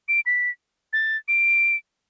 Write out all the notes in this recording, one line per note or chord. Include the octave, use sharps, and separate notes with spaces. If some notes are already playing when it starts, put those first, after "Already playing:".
D7
B6
A6
D7